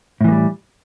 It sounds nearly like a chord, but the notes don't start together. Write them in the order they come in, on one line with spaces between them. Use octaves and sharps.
A2 E3 A#3 G3